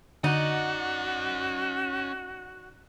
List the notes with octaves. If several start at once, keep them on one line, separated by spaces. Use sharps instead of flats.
D3 C#4 D#4 F#4 D5 D#5 F#5